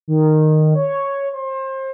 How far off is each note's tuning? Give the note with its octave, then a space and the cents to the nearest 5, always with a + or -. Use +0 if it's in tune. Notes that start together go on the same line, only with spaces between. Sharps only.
D#3 -10
C#5 +0
C5 +30